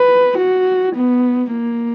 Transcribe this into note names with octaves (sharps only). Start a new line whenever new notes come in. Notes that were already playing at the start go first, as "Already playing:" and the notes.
Already playing: B4
F#4
B3
A#3